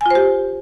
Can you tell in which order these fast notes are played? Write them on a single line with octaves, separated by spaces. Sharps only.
G#5 F4 C5 G4